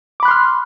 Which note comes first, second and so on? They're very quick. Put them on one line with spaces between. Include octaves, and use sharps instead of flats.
D6 B5 F#6 C6 F6